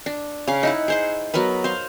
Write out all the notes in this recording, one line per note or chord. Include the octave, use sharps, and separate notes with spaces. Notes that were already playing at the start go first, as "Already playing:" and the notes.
D4
C#3 F5
D#4 E4 F#5
G#4 C5 F#5
F#3 B3 A#4 B4
C5 F5